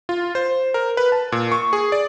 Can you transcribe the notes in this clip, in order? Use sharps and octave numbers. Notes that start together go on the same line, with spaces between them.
F4
C5
A#4
B4
A5
A#2
C#6
G#4
D5